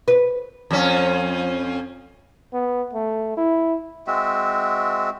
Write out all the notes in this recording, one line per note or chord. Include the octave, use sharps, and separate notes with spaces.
B4
F2 C#4
B3
A3
E4
G#3 C4 F#4 E5